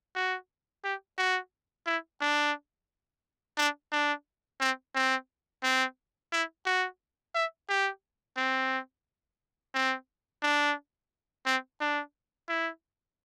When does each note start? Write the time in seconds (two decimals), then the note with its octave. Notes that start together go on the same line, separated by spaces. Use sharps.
0.16 F#4
0.84 G4
1.18 F#4
1.86 E4
2.21 D4
3.58 D4
3.92 D4
4.61 C4
4.95 C4
5.63 C4
6.32 E4
6.66 F#4
7.35 E5
7.69 G4
8.37 C4
9.74 C4
10.43 D4
11.46 C4
11.80 D4
12.49 E4